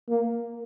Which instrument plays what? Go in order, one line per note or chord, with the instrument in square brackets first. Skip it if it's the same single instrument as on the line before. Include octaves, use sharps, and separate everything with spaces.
[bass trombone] A#3